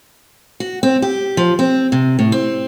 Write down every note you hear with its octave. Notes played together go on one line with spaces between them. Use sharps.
F#4
C4
G4
F3
C4
C3
A2
C4